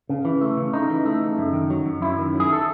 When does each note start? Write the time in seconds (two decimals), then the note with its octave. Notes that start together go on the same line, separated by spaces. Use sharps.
0.09 C#3
0.25 E3
0.41 A3
0.57 C#3
0.73 C#3 D#4
0.90 E3
1.05 A3
1.21 C#3
1.38 F#2
1.53 D#3
1.70 F#3
1.86 F#2
2.02 F#2 E4
2.19 D#3
2.34 F#3
2.40 G#4
2.53 A4